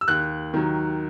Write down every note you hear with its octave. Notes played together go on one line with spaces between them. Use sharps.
E6
D#2 F#6
D#3 F#3